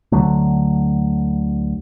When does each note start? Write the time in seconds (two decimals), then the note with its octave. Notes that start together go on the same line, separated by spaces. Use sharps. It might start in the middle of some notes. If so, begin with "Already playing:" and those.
0.12 D2 D3 F#3 A3